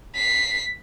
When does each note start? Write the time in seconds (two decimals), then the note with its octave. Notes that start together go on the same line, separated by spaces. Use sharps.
0.15 B6 C7